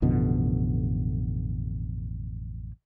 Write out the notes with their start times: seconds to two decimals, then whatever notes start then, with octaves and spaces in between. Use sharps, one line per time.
0.02 A1 F2 B2 D3